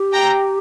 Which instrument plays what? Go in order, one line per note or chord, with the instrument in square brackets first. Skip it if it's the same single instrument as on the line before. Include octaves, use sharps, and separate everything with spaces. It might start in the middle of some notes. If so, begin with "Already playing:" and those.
Already playing: [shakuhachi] G4
[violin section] G5 A#5